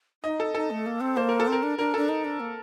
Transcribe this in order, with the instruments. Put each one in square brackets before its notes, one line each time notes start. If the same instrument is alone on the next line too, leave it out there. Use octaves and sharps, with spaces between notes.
[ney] D#4 [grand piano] D#5
[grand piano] A4
[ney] D#4 [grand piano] A4
[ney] A3
A#3
C4
[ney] A#3 [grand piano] C5
[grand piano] A#4
A4
[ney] C4 [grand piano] A#4
[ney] D4
[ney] D4 [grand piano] A#4
[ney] D4 [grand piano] A4
[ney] D#4
D4
A#3